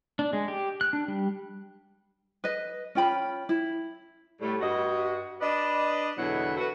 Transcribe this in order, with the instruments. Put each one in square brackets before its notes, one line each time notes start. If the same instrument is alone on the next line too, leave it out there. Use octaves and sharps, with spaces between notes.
[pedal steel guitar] D4
G#3
G4
F#6
D4
G3
[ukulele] B4 D#5
C#4 F4 G5 B5
E4
[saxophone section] A2 G3 A3
G2 F#4 D#5
D4 B4 D5 D#5
E2 B2 D3 F#3 E4 F#5
F#4 A4 B4